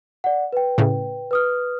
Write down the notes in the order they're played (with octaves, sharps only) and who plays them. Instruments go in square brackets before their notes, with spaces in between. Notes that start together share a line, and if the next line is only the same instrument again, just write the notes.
[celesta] D5 F#5
B4 G5
[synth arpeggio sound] A2 C#3
[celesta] B4 D#6 F6